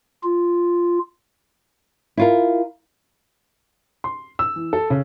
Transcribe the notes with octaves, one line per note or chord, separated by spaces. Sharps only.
F4
E4 F4 A#4
C6
E6
E3
A4
C#3